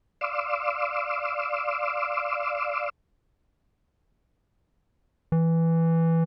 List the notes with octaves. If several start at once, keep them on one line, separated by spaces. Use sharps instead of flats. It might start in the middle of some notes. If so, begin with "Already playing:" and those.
D5 F5 C6 D6 E6
E3